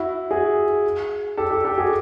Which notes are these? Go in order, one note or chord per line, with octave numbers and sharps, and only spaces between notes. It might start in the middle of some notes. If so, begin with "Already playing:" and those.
Already playing: E4 F#4
F#4 G#4
G4 A4
G4 A4
G4 A4
F#4 G#4